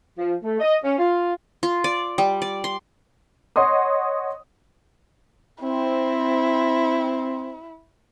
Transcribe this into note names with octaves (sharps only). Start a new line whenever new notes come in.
F3
A3
D#5
C#4
F4
F4
D5
G3
D5
C6
C#5 D#5 F#5 C6 D#6
C4 E4